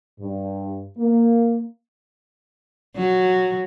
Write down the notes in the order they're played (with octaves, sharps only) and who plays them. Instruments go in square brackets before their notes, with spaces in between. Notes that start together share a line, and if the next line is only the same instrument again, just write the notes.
[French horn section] G2
A#3
[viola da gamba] F#3